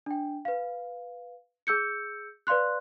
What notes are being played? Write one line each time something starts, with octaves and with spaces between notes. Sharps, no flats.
D4 G5
B4 F5
G#4 E6 G6 C#7
B4 D5 F5 C6 F#6